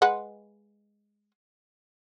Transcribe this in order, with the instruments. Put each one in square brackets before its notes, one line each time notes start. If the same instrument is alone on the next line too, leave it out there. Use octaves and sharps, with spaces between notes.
[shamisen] G#3 B4 F#5